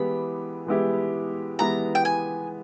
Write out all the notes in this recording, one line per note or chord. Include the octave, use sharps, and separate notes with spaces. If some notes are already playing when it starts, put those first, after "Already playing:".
Already playing: E3 G#3 B3 E4 G4 B5
E3 G#3 B3 E4 G4
E3 G#3 B3 E4 G4 A#5
G5
G#5